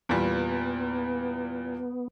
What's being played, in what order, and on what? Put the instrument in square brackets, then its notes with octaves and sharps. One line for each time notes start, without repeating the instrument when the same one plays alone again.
[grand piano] E2 A#2 G3 [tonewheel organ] B3